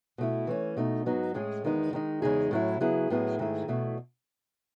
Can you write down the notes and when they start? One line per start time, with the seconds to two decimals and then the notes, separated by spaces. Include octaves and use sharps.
0.18 B2 A3 E4
0.47 E3 A3 C#4
0.77 B2 A3 D#4
1.06 G#2 F#3 B3 D#4 F#4
1.34 A2 G#3 C#4 G#4
1.64 E2 D#3 G#3 B3 D#4
1.93 D#3 G#3 D#4
2.22 E2 C#3 G#3 D#4 G#4
2.51 A2 F#3 C#4 E4
2.81 C#3 F#3 B3 E4 G#4
3.10 A2 F#3 B3 E4 G#4
3.39 G#2 D#3 A3 E4 G#4
3.68 E2 B2 A3 E4